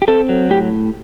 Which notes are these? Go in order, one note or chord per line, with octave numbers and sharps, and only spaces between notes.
G4
C4 A4
F#3
A2 G4